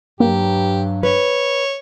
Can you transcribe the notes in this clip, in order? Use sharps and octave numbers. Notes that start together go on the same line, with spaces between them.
G2 F#3 A#3 G4
B4 C#5